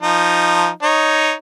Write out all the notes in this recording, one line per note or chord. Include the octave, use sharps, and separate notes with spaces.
F3 D#4
D#4 C#5